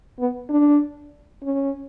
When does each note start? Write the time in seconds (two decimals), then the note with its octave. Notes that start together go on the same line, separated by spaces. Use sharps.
0.19 B3
0.49 D4
1.43 C#4